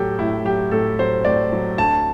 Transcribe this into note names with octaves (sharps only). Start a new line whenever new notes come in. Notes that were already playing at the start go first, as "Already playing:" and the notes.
Already playing: A2 F#3 G4 A4
A2 E4
F#3 G4
A2 A4
F#3 C5
A2 D5
F#3
D2 A5